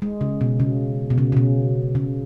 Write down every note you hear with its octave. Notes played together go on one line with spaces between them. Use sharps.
G#3
C#3
B2
C#3
B2
C#3
C#3
B2
C#3